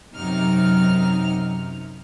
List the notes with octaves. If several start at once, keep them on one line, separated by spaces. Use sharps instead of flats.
F#2 C3 F#3 D#4 F6